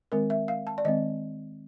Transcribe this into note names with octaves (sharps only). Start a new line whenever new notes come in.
D#3 G#3 C4 A#4
E5
F5
A5
D5
D#3 G#3 C4 D#5